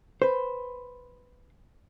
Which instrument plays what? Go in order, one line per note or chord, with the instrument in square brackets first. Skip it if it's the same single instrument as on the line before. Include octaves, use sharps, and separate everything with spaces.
[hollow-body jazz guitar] B4 C5